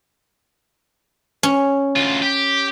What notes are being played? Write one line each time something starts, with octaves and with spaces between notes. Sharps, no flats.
C#4
D2 F4
G4